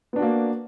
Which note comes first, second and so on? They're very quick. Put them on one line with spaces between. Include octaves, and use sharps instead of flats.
B3 D4 F#4 A#3